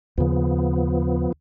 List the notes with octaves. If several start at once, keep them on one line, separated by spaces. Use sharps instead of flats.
D#2 C#3 F3 B3